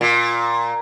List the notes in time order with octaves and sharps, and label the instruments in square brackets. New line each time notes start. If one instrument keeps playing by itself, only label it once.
[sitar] A#2